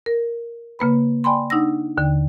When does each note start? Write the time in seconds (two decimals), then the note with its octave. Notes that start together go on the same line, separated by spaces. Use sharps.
0.06 A#4
0.79 C#3 A#3 B4 B5
1.24 D5 G5 G#5 B5 C6
1.50 D4 D#4 F#5 E6 A#6
1.97 D#2 D3 G5